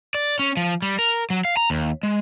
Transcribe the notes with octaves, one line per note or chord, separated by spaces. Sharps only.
D5
C#4
F3
G3
A#4
F#3
F5
A#5
D#2
G#3